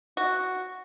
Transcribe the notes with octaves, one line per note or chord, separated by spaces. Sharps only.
F#4